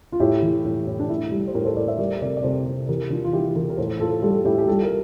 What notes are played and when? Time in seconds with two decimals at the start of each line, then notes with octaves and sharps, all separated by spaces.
0.12 F4
0.20 A2 E4 G4
0.42 E3
0.65 A2
0.87 A2
0.99 D4
1.10 A2 E4
1.31 G3
1.47 C5
1.54 A2 G4 A#4
1.65 A4 C5
1.76 A2 A#4 D5
1.88 C5 E5
1.98 G3 A#4 D5
2.21 C3 A#4 D5
2.37 D5
2.43 C3 A4 C5
2.66 C3
2.89 E3 G4 A#4
3.10 E3 D4 F4
3.25 F4
3.33 E3 E4 G4
3.55 E3 G4 A#4
3.70 A#4
3.77 A2 A4 C5
4.00 A2 F4 A4
4.22 G3 F4 A4
4.36 A4
4.44 A2 E4 G4
4.58 G4
4.68 G3 F4 A4
4.84 A#4